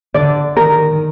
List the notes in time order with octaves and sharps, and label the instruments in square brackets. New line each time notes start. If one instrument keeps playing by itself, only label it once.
[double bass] D3 [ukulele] D5
[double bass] D#3 [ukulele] A#4